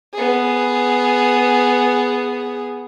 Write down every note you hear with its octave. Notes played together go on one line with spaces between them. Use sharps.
B3 G#4